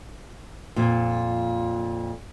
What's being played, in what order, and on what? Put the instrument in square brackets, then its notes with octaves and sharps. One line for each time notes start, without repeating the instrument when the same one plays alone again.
[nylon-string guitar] F2 A#2